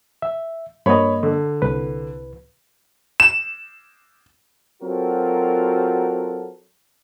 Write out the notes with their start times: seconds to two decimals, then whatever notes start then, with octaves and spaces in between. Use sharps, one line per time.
0.22 E5
0.86 G2 A#3 C#5 D#5 B5
1.23 D3
1.62 C2 B4
3.20 E7
4.82 F#3 C4 F4 F#4 A4 A#4